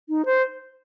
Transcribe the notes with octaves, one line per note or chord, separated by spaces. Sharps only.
D#4
C5